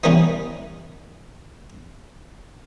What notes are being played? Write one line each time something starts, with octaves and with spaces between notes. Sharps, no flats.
D#3 E3 G3 B3 C#4 D#4